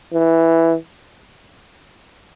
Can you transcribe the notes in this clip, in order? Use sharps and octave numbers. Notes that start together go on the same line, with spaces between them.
E3